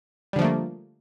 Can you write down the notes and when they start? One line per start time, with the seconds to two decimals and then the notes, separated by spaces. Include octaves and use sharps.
0.33 G3
0.36 D3
0.39 F3
0.42 A3
0.44 A#3